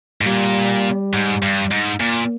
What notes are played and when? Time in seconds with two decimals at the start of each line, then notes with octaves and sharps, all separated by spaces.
0.21 G#2
0.26 A#2 G3
1.13 G#2
1.42 G2
1.71 G#2
2.00 A#2 A#3